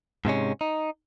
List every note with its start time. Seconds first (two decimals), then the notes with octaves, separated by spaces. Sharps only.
0.25 G#2 C3 G#3 C#4
0.61 D#4